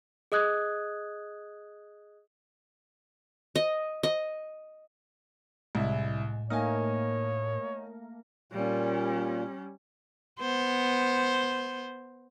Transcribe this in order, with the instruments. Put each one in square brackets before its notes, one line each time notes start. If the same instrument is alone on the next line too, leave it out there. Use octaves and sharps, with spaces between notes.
[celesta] G#4 D#5 D#6 F#6 G#6
[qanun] D#5
D#5
[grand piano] C2 E4 [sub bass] A2 [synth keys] G#3
[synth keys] A3 A#3 A#4 [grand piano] D#4 G#5 [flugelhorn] C#5
[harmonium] A#2 [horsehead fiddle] G3 C#4
[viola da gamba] B3 C5